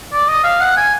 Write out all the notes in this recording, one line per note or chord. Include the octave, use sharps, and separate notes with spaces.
D5
D#5
F5
F#5
G#5